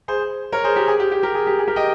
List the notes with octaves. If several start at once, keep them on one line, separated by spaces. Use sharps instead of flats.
G#4 C5
A#4 C#5
G#4 C5
G4 A#4
G#4
G4
G4
G4 A#4
G#4
G4
G#4
G4 A#4
D#5 G5